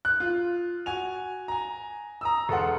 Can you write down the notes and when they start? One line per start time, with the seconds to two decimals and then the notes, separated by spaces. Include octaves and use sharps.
0.05 F#6
0.20 F4
0.86 F#4 G#5 F7
1.48 G#5 A#5
2.21 A#5 D#6 E6
2.49 E1 A4 F#5 C6